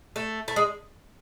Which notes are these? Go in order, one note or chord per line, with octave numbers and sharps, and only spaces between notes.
A3
A3
G#3